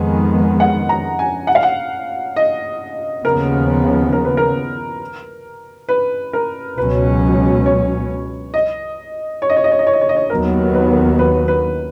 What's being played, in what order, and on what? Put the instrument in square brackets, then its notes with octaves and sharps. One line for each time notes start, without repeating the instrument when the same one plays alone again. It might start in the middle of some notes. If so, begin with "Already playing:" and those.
Already playing: [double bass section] F2 D#3 G#3 B3 [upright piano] G#5
[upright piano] F#5
A#5
G#5
F#5
F5
F#5
D#5
[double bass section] D#2 C#3 F3 B3 [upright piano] A#4
[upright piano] A#4
B4
A#4
B4
A#4
[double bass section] C#2 B2 F#3 C#4 [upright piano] B4
[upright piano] C#5
D#5
C#5
D#5
C#5
D#5
C#5
D#5
C#5
D#5
C#5
D#5
C#5
[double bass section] D#2 D#3 F#3 B3 [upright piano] A#4
[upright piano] B4
B4
B4